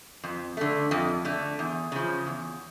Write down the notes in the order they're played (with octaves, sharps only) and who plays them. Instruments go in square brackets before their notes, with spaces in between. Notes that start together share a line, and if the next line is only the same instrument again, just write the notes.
[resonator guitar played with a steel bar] F2
D3 A3
F2
D3 A3
E2
C#3 F3
E2